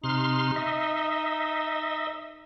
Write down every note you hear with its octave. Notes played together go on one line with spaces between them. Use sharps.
C3 D#4 C6 F6
D#5 E5